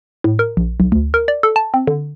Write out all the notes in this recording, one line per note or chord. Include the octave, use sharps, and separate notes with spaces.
A2
A#4
A#1
B1
D2
A#4
D5
A4
A5
C4
D3